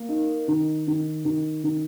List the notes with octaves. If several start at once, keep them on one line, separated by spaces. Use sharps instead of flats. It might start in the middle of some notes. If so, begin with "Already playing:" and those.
Already playing: A#3
D#4
D#3
D#3
D#3
D#3